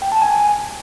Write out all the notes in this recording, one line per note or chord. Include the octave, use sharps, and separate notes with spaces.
G5
A5
G#5